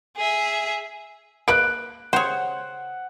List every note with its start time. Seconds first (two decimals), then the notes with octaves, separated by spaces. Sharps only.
0.16 G#4 E5
1.48 A#3 B4 D#5 F#6 D7
2.13 C#3 G4 C5 C#5 F#5